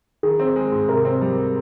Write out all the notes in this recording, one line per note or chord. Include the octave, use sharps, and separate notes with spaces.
D#3 G#4
C4
G#3
G#2
C3 A#4
C4
G3